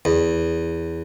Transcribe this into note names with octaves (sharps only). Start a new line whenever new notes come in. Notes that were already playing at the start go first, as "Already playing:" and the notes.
E2